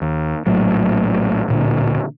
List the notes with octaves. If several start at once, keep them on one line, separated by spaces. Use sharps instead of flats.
D#2
A#1 A2 F#3
D1 A#2 D3